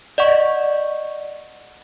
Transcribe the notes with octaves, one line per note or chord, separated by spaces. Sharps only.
D5 D#5 F#5 C#6